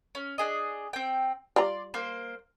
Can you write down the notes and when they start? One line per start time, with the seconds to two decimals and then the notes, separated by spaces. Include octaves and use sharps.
0.15 C#4
0.38 D4 G#4 D#5
0.93 C4 G5
1.56 G3 F4 D5 A#5 C6
1.94 A#3 C5